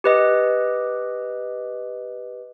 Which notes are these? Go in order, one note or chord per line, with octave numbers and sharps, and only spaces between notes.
G4 B4 D#5